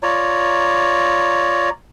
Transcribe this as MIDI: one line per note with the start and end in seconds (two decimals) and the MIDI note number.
0.03 1.70 65
0.03 1.70 73
0.03 1.70 74
0.03 1.70 82